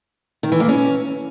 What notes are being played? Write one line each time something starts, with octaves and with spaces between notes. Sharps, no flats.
D#3
E3
A#3
C#4